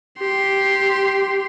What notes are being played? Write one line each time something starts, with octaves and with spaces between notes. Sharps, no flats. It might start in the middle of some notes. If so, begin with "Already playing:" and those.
G4 C6